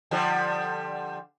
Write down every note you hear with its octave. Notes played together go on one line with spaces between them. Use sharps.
D3 F3 G3